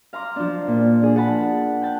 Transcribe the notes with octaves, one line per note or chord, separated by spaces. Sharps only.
F5 A#5 C6 D6
F3 D4
A#2
D4 G#4
F#5 A5 B5
G5 A5 F#6